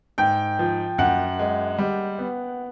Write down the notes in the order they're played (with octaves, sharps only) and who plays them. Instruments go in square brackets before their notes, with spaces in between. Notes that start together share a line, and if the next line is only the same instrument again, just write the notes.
[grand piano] G#2 [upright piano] G5
[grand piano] F3
[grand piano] F#2 [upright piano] F#5
[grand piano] G#3
G3
B3